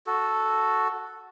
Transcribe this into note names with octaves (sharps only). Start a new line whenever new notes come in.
F#4 A4